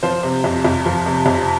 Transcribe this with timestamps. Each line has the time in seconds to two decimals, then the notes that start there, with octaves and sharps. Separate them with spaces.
0.03 F3 C5
0.23 C3
0.44 F2
0.65 F2
0.86 F3
1.06 C3
1.26 F2